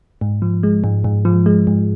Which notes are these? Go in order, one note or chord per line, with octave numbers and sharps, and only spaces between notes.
G#2
F3
G#3
G#2
G#2
F3
G#3
G#2